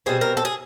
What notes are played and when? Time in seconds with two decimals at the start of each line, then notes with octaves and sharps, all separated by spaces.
0.06 B2 G3 C4 G#4
0.21 A#4
0.37 A4
0.45 G#4